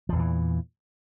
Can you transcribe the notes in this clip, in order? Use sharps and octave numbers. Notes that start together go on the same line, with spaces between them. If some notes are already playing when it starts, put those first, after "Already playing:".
E2 A#2 E3 F3